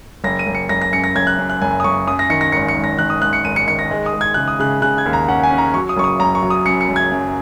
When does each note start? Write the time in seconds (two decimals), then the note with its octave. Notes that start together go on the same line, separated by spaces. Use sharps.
0.24 F#1 A#6
0.39 D#7
0.47 F#1
0.55 C#7
0.69 F#1 A#6
0.82 A#6
0.92 F#2 C#7
1.04 A#6
1.15 F#1 G#6
1.27 F#6
1.38 F#2
1.50 F#6
1.62 F#1 G#5
1.80 D#6
1.84 F#1 C#6
2.07 F#2 D#6
2.19 A#6
2.30 D#3 C#7
2.41 A#6
2.52 G#1 C#7
2.68 C#7
2.77 G#1
2.84 A#6
2.98 D#3 F#6
3.10 D#6
3.22 G#1 F#6
3.33 C#7
3.45 G#1 D#7
3.56 C#7
3.67 D#3 C#7
3.79 A#6
3.91 G#3
4.06 D#6
4.13 G#3
4.21 G#6
4.34 C#3 F#6
4.48 D#6
4.60 C#3 F#6
4.82 C#3 F#6
4.98 G#6
5.06 D#2
5.13 A#5
5.28 C#4 F#5
5.43 G#5
5.51 C#4
5.58 A#5
5.74 F#3 C#6
5.89 D#6
5.97 F#1 C#6
6.04 D#6
6.19 F#1 A#5
6.35 C#6
6.42 F#3
6.50 D#6
6.66 F#2 C#7
6.81 C#7
6.89 F#1
6.96 G#6
7.12 F#2